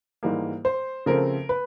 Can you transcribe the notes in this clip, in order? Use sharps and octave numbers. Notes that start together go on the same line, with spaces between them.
G#2 E3 G3 A#3
C5
C#3 F3 A3 C4 A#4
B4